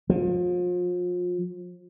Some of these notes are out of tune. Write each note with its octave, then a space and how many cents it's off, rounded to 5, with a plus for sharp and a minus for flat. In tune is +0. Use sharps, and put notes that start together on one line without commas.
F3 +35